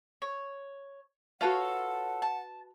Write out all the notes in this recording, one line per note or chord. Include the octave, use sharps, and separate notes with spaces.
C#5
F4 F#4 A4 B4 C#5 F5 F#5
A5